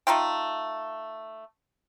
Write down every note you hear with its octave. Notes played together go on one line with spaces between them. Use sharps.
A3 D#4 F4 G5